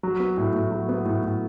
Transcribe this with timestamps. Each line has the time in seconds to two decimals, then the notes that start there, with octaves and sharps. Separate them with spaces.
0.03 F#3
0.20 B3
0.38 A2
0.54 A2
0.71 F#3
0.89 B3
1.05 A2
1.23 A2